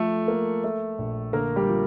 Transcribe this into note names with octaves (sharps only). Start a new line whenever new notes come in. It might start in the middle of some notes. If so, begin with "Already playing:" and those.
Already playing: F3 A3 A4
A#3
A3
A#1
D3 A#3 A#4
G3 G4
F3